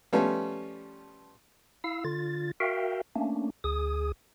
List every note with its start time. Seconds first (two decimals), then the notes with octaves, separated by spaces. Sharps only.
0.13 F3 G3 A3 B3 C#4
1.84 E4 F5 E6
2.05 D3 F4 A6
2.60 F#4 A#4 E5 F5 G5
3.16 A3 A#3 C#4 D4
3.64 D2 G#4 D#6